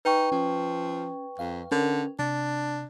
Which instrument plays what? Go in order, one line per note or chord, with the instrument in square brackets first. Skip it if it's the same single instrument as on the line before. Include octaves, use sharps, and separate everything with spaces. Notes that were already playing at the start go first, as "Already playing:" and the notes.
[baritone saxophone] D#4 [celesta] B4 G5 C#6
[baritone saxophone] F3 [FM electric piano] C#4
[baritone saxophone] F2 [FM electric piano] F5
[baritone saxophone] D3 [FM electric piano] C#4 A#4
[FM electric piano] C3 [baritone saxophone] D4